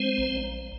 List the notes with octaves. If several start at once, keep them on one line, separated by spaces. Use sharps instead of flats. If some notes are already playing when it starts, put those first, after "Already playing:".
Already playing: G#3 C4 C5
A#1